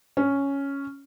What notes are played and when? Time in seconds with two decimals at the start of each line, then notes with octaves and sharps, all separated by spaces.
0.17 C#4